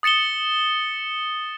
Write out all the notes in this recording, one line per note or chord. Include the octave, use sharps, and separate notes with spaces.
D#6 A6 C#7 E7 G7